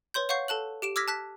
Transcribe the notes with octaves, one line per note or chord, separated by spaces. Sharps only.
B4 C#5 C6 G6
C#5 F5 F#5 C#6 G6 C7
A4 A5 F#6 F#7
G4 D7 E7
D6 E6 F6 G#6 A#6 B6
A5 F#6 B6